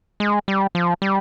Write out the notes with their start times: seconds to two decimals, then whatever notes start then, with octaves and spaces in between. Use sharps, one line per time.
0.20 G#3
0.48 G3
0.75 F3
1.02 G3